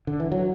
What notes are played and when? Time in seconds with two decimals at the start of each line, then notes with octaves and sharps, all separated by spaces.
0.07 D3
0.20 E3
0.32 F#3